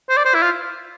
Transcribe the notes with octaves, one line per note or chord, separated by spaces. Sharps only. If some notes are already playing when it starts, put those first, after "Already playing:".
C5
D5
C5
E4
F4